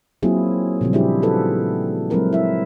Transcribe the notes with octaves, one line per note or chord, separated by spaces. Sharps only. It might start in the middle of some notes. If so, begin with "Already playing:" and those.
F#3 A#3 C4 E4 F4 G#4
A#2 C#3 F3 G3 C4
G3 D4 E4 F4 G4 G#4
D#4 F4 F#4 A4 B4
F#3 G#3 C4 E4 A#4 B4
E4 E5